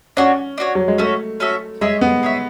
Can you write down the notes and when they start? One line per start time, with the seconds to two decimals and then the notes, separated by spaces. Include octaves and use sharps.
0.17 C#4 D4 F#4 C#5
0.58 D4 F#4 C#5
0.75 F#3
0.88 G#3
0.98 A3 C#4 F#4 A4 E5
1.40 C#4 F#4 A4 E5
1.81 G#3 G#4 C#5 E5
2.01 B3
2.23 G#4 C#5 E5